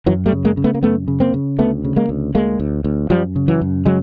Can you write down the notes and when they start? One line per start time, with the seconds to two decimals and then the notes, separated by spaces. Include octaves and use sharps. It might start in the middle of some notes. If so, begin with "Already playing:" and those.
0.06 F#2 E3 F#3
0.26 G3 A3
0.32 C#3
0.45 G#3 A#3
0.57 C#3
0.64 A3 B3
0.74 A#3
0.83 F#2 A3 B3
1.08 C#3
1.20 A#3 C4
1.34 C#3
1.59 D2 A3 B3
1.84 C#3
1.96 G#3 A#3
2.09 D2
2.35 D2 G#3 A#3
2.60 D2
2.84 D2
3.10 F#2 F3 G3
3.36 C#3
3.48 E3 F#3
3.61 F#2
3.85 C#3 F#3 G#3